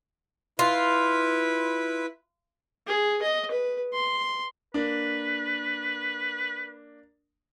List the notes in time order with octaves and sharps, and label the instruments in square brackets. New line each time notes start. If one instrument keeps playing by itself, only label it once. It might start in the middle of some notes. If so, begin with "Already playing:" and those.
[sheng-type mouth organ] E4 B4 [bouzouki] F4
[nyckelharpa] G#4
D#5
B4
C6
[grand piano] A#3 D4 [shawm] B4